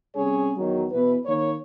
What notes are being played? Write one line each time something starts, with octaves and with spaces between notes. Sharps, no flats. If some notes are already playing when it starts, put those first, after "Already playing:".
C3 G3 C#4 G#4 C#5
E2 D#3 F#3
B2 E3 B4
D#3 A#3 C#5